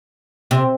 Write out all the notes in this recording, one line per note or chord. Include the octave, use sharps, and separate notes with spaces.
C3